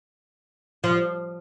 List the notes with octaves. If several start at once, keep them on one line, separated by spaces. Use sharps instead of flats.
F3